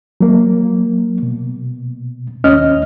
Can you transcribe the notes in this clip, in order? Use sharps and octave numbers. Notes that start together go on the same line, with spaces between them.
F#3 A#3
B2
D#2 C#4 D#5 F6